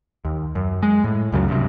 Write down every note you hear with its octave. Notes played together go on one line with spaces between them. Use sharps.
D#2
F#2
G#3
A2
C#2 F#2 C#3 F#3
G2 C3